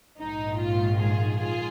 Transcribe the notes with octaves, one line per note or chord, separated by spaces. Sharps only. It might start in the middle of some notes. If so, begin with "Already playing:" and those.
A#1 G#2 D#3 D#4
F4
F4 G#4
F4 G#4